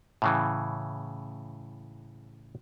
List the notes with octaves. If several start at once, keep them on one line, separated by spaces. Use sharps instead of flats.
A2 C#3 E3